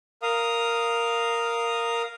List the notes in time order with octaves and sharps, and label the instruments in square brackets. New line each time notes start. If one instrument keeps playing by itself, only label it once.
[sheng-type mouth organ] A#4 F5 D#6